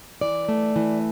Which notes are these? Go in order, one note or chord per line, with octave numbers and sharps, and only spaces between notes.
E3 D5
A3
E3